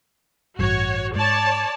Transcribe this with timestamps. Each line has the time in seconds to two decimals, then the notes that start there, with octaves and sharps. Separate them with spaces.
0.59 A1 G2 F#4 C#5
1.16 G#2 C#5 D5 A5